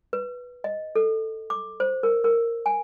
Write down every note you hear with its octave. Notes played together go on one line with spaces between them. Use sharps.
B4
D#5
A4
D6
C5
A#4
A#4
G#5